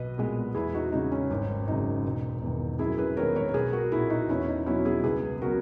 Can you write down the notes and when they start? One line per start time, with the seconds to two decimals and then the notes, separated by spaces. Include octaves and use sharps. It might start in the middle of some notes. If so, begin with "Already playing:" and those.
Already playing: B1 B4 D#5
0.18 A#2 G#3 B3
0.55 E2 E4 G#4
0.74 D#4 F#4
0.92 C#3 G#3 D#4
1.12 C#4
1.30 G#1 C#4
1.68 F#2 C#3 D#4
2.04 E1
2.42 E2 D#3
2.79 F#2 E4 G#4
2.98 G#4 B4
3.16 D#3 G#3 B3 A#4 C#5
3.35 A#4 C#5
3.48 A#4
3.54 B1 G#4 B4
3.73 F#4 A#4
3.92 A#2 A#3 E4 G#4
4.10 D#4 F#4
4.29 E2 C#4 E4
4.48 D#4
4.66 B2 F#3 B3 C#4 E4
4.85 E4 G#4
5.03 C#2 G#4 B4
5.41 C#3 F#3 B3 F#4 A#4